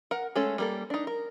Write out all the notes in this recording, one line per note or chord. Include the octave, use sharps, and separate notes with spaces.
A#4 F#5
G#3 A3 C#4 A4
G3 A#3 A4
D4 D#4
A#4